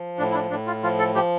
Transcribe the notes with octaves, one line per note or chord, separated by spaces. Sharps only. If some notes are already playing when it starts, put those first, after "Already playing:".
Already playing: F3
A2 D4
E4
D4
A2 D4
F4
F3 F4
A4
F3 G4